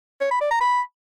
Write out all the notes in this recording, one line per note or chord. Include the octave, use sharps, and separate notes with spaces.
C#5
B5
D5
A#5
B5